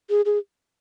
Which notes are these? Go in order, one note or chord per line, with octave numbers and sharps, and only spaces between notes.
G#4
G#4